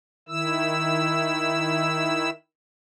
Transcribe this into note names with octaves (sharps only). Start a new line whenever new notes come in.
D#3 E4 E6